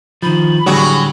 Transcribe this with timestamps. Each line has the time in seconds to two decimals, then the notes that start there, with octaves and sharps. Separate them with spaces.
0.23 D#3 F3 B5
0.66 A2 D3 F#3 G3 F#4 G#4